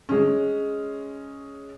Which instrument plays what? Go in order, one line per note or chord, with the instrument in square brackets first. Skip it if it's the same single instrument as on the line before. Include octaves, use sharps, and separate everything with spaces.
[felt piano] G#3 C#4